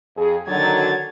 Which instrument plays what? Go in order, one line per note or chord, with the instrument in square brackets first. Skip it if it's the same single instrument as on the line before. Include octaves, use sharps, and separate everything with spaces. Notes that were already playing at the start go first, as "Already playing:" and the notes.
[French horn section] F2 G#4
[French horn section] D3 D#3 F#3 [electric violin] G#6 A6